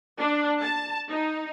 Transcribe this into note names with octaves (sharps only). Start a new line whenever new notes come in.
D4
A5
D#4